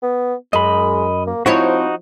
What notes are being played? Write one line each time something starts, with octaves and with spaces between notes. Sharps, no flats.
B3
F#2 G#3 D#5 B5
A#3
F3 C4 D#4 E4 F#4 C#5